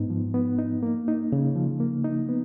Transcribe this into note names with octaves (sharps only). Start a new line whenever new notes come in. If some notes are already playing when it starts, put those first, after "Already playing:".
Already playing: G#2 B3 D#4
F3
B3
D#4
A#3
D#4
C#3
F3
A#3
D#4
B3